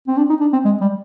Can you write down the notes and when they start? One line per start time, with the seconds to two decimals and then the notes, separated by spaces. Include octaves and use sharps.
0.08 C4
0.17 D4
0.29 D#4
0.41 D4
0.53 C4
0.65 G#3
0.81 G3